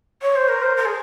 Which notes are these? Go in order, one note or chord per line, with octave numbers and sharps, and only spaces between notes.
C#5
C5
A#4
C5
A#4
G#4